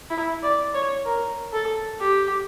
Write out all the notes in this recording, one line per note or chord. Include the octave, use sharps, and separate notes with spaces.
E4
D5
C#5
A#4
A4
G4